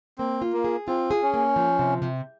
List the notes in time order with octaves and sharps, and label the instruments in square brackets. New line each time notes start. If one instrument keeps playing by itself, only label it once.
[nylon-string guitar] A#3 [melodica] C4
[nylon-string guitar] F4
[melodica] A#3
[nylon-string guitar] G#4
[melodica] C4 [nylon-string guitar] F4
[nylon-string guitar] G#4
[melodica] C#4
[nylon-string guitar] A#3
F3
C3
C3